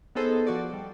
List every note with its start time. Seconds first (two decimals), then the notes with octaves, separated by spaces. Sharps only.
0.15 B3 D#4 G#4 A4 C5 D#5
0.47 F3 F#4 D5
0.73 G3